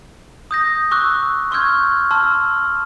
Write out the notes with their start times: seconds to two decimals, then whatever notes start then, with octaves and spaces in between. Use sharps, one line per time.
0.51 D#6 G6 A#6
0.91 C#6 D6 E6 F#6
1.51 C6 C#6 E6 F6 G6 G#6
2.11 A5 C6 E6 F6